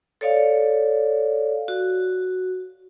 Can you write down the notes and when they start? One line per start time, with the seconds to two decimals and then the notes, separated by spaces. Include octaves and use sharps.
0.21 A4 C#5 D5 F5
1.68 F#4